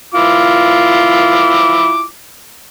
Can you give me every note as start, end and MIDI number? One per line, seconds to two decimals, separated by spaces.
0.14 2.04 64
0.14 2.04 65
0.14 2.04 86